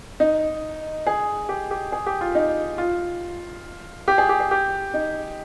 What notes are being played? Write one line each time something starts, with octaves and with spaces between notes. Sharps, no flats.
D#4
G#4
G4
G4
G#4
G4
F4
D#4
F4
G4
G#4
G4
G#4
G4
D#4